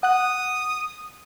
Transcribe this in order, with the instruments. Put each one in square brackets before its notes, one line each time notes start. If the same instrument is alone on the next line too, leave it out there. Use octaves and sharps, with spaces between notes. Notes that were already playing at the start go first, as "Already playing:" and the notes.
[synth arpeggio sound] F#5 F#6 [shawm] D#6